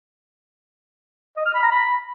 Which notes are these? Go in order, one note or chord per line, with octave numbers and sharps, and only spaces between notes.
D#5
F6
B5
A#5
B5